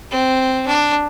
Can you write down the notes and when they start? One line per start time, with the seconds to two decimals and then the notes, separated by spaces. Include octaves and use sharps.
0.11 C4
0.67 D4